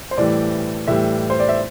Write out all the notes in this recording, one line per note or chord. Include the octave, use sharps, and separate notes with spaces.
C5
A2 E3 G3 D5
A2 E3 G3 E5
C5
D5
E5